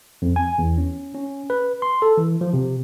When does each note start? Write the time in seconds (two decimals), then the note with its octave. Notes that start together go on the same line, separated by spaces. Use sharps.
0.22 F2
0.36 G#5
0.58 E2
0.78 C#4
1.15 C#4
1.50 B4
1.82 C6
2.02 A4
2.17 E3
2.41 F3
2.53 C3